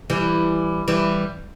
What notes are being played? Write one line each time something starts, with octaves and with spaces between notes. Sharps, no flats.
E3 G3
E3 G3